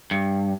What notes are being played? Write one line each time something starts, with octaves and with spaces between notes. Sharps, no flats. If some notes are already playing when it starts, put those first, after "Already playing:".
G2